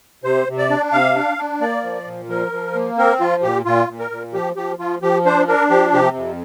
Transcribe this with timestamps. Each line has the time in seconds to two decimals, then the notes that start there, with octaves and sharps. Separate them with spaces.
0.24 C3 C5
0.48 C3
0.58 D5
0.70 D4
0.92 C3 F5
1.15 D4
1.37 D4
1.61 A#3 D5
1.84 F3
2.06 A#2
2.29 F3 A#4
2.52 F3
2.75 A#3
2.98 C4 A#4
3.20 F3 F4
3.42 A#2 G4
3.65 A#2 F4
3.89 A#2
3.99 A#4
4.11 A#2
4.33 F3 G4
4.56 F3 G4
4.79 F3 F4
5.02 F3 G4
5.25 D4 C5
5.48 D4 A#4
5.70 F3 G4
5.93 C3 G4
6.16 F2